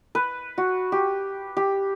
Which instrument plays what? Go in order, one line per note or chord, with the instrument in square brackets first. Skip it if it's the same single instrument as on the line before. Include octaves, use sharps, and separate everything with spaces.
[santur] B4
F#4
G4
G4